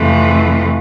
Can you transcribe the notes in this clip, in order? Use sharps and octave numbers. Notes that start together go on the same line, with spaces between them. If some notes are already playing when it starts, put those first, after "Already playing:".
Already playing: F2 C3 E3 A3